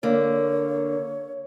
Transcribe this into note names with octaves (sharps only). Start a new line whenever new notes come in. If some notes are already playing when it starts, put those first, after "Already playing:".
D3 A#3 C#5